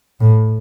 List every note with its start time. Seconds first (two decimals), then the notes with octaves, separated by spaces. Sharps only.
0.20 A2